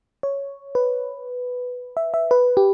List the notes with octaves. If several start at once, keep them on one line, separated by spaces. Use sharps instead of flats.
C#5
B4
E5
E5
B4
G4